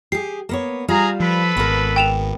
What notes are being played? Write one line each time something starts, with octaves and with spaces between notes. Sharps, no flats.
G4 G#4 C7
A#3 B3 C#5
G3 F4 G#4 F5 A#5
F3 A4 B4 B5
G#1 B3 A#4
G5 E7 F7